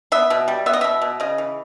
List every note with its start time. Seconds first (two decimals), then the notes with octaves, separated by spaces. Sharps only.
0.12 B3 E5
0.30 B2
0.48 G3
0.66 B3 E5
0.73 D#5
0.81 B2 E5
1.02 B2
1.20 C#3 D#5
1.38 E3